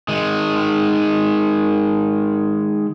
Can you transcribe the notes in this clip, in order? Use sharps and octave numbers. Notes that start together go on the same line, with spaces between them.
D#3 G#3